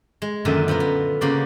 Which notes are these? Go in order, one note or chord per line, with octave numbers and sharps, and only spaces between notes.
G#3
F#2 A#2 D3 D#3 A4 E5
F3 B3 F4 A#4
B3
C#3 A#3 F#4 C5 D5